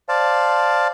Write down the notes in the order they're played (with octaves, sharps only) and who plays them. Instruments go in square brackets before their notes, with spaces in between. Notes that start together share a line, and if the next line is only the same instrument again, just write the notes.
[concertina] C5 D5 F5 A5